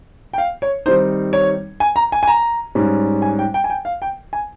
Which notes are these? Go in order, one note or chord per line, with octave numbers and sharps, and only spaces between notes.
G5
F5
C#5
D#3 G3 C4 D#4 C5
C#5
G#5
A#5
G#5
G#5
A#5
G#2 G3 C#4
G#5
G5
G5
G#5
G5
F5
G5
G#5